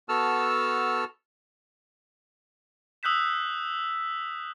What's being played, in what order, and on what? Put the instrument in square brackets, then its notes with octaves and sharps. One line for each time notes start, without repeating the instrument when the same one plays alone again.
[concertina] B3 F#4 A4 A5 E6 F6
[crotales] D#6 E6 F#6 G6 B6 E7